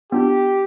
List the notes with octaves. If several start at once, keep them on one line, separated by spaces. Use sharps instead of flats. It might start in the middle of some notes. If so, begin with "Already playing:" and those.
B3 D4 F4 G4